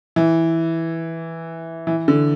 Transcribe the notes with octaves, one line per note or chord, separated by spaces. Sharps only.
E3
E3
D3